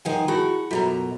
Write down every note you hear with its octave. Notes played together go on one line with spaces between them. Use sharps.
D#3 F3 F#5 G#5
E4 F#4 G#4 B5
F#2 B2 F4 F#4 A4 A#5